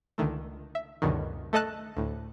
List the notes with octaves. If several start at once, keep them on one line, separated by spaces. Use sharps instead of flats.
C#2 D3 D#3 A3
E5
C#2 F#2 B2 D3 D#3
A3 A4 D#5 A5 F#6
D2 A2